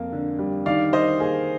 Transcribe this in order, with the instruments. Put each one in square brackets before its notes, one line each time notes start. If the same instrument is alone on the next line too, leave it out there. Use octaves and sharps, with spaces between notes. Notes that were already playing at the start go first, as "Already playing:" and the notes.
Already playing: [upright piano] F2 A#3
D3
G3
D#3 D5 F5
D#3 C5 D#5
A#3 G#4